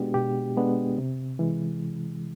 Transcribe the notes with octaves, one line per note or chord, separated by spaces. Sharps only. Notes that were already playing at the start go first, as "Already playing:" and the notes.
Already playing: B2 G#3 B3 D4 F#4 G4
B2 G4
G#3 B3 D4
C3
E3 G#3